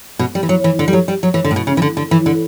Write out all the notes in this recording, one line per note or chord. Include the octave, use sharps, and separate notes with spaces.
B2
G3
E3
F#3
E3
D3
G3
F#3
G3
F#3
E3
D3
A2
B2
C#3
E3
D3
D3
E3
D3